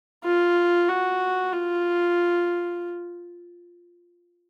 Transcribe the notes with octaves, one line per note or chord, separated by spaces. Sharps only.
F4
F#4
F4